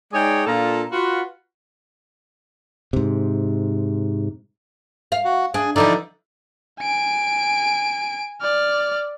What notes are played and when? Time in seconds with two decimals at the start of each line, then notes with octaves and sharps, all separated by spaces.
0.13 G#3 D#4 G#4 C#5 D5 G5
0.46 A#2 D4 F4 A4 A5 A#5
0.91 F4 F#4 B4
2.93 G#2 C3
5.12 F5
5.25 F#4 F#5
5.54 D4 G#4 G#5
5.76 D3 E3 F3 D#4 D5
6.81 G#5 D7
8.42 D5 F6